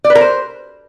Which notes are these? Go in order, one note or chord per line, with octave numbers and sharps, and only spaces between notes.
D5
B4
A#4
C5